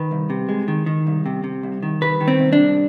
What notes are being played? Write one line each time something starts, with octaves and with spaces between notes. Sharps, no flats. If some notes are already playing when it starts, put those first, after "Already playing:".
Already playing: D#3 B4
C2
C3
G#3
D#3
D#3
C2
C3
C3
C2
D#3
C2 B4
D#3
C4
C2
D4
C2